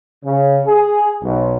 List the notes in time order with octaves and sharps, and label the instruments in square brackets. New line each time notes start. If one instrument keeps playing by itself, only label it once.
[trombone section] C#3
G#4
B1